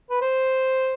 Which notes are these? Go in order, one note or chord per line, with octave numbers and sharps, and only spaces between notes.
B4
C5